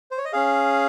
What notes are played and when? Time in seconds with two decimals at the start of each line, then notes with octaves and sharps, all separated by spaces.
0.11 C5
0.18 C#5
0.25 D#5
0.33 C#4 G#4 F5